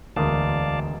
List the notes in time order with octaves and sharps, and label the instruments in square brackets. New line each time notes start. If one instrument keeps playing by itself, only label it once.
[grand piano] E1 A#4 D#6 [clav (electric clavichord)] D2 [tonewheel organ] D5 F5 A5